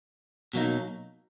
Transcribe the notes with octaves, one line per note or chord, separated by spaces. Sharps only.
B2 F#3 A#3 D#4